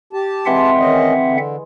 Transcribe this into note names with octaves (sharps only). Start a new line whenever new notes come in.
G4 A5
E3 G#3 C4 E5 F#5 C6
D#3 C#4 D#5
D3